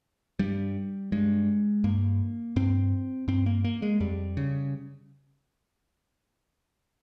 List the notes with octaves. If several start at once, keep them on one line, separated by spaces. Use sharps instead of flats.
G2 G3
G2 G#3
G2 A#3
G2 C4
G2 C4
A#3
A#3
G#3
F2 G3
C#3